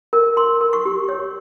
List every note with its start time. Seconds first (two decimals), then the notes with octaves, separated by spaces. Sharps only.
0.13 A#4
0.37 A#4 C6
0.61 A#4
0.73 C#6
0.86 G4
1.09 C#5